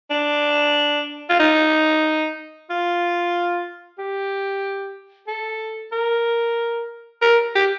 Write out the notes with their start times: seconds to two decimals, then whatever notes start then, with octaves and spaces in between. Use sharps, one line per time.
0.10 D4
1.30 F4
1.40 D#4
2.70 F4
3.98 G4
5.28 A4
5.92 A#4
7.22 A#4
7.55 G4